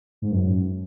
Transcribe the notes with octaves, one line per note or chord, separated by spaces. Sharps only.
G#2
F#2